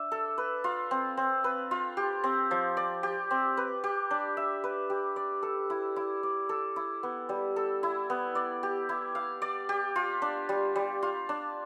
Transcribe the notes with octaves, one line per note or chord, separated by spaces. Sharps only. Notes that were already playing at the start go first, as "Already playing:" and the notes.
Already playing: D4 E5
A4
B4
F4
C4
C4
B4
F4
G4
C4
F3
D5
G4
C4
B4
G4
D4
E5
B4
G4
D5
A4
E4
E4
D5
A4
E4
B3
G3
A4
E4
B3
D5
G4
E4
F5
D5
G4
F4
D4
G3
G3
F4
D4